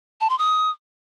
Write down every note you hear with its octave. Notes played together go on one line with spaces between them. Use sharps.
A5
C6
D#6